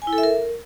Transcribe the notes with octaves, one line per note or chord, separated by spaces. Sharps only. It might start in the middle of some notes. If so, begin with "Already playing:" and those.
G#5
E4
A4
E5
A#4